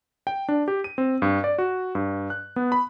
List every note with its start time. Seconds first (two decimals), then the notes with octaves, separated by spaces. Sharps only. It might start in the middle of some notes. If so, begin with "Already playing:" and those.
0.27 G5
0.49 D4
0.68 G4
0.84 D#7
0.98 C4
1.22 G2
1.44 D5
1.58 F#4
1.95 G2
2.30 F#6
2.56 B3
2.72 B5